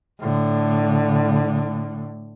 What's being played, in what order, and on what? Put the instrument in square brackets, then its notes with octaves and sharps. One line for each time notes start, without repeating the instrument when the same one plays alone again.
[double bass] A2 D3